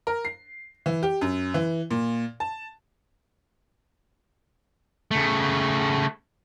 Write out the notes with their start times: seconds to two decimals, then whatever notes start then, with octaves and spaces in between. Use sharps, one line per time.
0.07 A#4
0.25 C7
0.86 E3
1.03 G4
1.21 F#2
1.54 E3
1.91 A#2
2.40 A5
5.11 C#3 A3